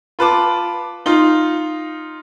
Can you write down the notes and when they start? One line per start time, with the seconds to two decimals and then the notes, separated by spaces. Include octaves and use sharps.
0.19 F4 B4 A5 D6
1.06 D#4 F4